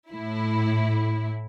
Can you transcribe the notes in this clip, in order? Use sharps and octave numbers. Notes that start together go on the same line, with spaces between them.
A2 E4